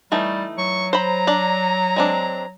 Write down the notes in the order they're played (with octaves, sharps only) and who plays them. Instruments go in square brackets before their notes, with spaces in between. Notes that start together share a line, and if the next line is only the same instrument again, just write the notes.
[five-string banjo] E3 A3 D#4 [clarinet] G3
[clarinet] F#3 [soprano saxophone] C#6
[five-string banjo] C5 B5 [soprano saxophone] A#5
[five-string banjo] D4 D5
G#3 C4 D4